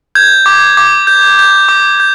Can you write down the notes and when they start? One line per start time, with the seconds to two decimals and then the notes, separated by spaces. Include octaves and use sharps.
0.15 G6 G#6
0.46 D6
0.77 D6
1.07 G6
1.39 G6
1.69 D6
2.00 G6